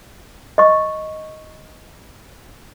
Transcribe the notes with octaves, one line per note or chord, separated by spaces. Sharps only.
D#5 C#6